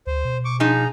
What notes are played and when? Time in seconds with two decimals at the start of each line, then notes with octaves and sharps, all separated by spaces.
0.07 D2 C5
0.25 B2
0.45 C#6 D6
0.60 F3 D#4 G#4 A#5